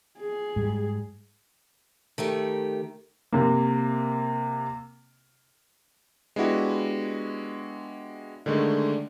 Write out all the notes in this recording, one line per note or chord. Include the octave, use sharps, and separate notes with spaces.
G#4
G#2 G3
D#3 A3 G4
C3 A#3
G#3 B3 D4 E4 F#4 G4
D3 D#3 G#3 A3 D4